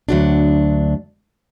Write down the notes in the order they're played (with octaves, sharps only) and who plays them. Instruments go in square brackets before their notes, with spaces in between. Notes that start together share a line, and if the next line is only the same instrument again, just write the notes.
[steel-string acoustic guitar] D2 F#3 D4